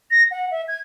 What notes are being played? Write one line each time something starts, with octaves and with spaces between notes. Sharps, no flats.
A#6
F#5
E5
G#6